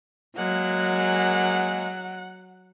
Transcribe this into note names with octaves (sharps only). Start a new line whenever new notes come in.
F#3 G#3 A#3 F#5